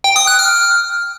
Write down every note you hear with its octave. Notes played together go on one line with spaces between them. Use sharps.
G5
D#6
F#6
F6